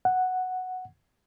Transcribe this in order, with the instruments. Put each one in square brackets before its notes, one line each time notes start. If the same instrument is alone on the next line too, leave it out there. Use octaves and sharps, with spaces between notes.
[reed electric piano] F#5